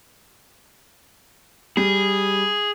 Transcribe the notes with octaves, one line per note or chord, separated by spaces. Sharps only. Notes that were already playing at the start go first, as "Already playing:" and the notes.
G3 G#4